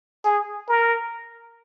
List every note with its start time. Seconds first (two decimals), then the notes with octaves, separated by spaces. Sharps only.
0.24 G#4
0.68 A#4